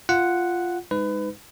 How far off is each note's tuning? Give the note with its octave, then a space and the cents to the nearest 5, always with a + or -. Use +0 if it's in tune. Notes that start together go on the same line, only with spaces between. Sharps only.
F4 -5 F#5 +0
G#3 -20 D#4 +0 B4 +25